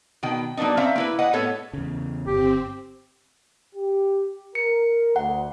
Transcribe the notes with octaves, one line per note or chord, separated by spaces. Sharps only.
B2 D#3 G5
F#3 A#3 B3 D4 D#4
C4 C#4 C5 E5 F5 A#5
A#3 E4 B4
B4 D#5 F#5
A2 B3 A4 C#5
E2 C#3
G1 C4 G4
G4
A#4 C#7
D2 F#5